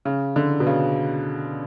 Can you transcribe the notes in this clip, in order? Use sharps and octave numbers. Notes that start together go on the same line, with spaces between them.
C#3
D3
B2
C#3